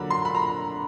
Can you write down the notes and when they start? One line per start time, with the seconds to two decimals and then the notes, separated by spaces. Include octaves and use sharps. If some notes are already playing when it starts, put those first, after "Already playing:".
Already playing: D3 F#3 A#3 A#5 B5
0.10 C6
0.25 B5
0.35 A#5